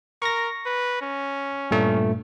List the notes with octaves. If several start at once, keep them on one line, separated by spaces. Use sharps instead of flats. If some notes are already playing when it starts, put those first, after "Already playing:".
A#4 C#6 A#6
B4
C#4
G2 A#2 A3